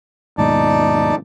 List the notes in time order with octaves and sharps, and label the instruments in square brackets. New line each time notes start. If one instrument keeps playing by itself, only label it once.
[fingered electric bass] D#2 G#2 B2 [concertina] D#4 D5 A5